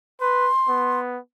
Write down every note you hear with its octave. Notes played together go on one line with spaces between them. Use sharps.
B4 C6
B3